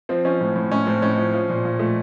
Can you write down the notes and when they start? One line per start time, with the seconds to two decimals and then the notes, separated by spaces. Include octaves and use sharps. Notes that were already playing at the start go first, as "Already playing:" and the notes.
0.09 F3 C4
0.25 F3 C#4
0.41 A2
0.56 A2
0.71 A2 C#4
0.87 A2 C4
1.02 A2 C#4
1.18 F3
1.34 F3
1.50 A#2
1.65 A#2
1.79 F3 A3